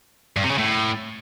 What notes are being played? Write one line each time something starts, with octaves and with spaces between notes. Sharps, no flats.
G2
C3
C#3
A2